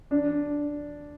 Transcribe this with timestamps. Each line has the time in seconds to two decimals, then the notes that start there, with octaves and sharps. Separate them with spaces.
0.11 D4